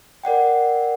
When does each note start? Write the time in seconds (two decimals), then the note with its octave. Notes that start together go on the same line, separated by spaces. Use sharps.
0.24 A#4 D5 F#5 G5